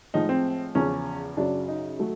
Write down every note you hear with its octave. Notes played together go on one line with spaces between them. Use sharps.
A2 F3 G#3 D#4
C4
E2 C#3 F3 C#4
F#2 C#3 F#3 D4
D#4
F#3 A3